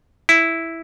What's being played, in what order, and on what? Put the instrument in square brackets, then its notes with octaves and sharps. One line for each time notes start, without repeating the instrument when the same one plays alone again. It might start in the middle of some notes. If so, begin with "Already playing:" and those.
[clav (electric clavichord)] E4